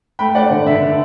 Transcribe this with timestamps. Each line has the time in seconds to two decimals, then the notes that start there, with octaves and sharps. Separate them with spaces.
0.19 A3 G5 B5
0.35 A3 D5 F#5
0.50 D3 D5
0.66 D3 E5
0.82 D3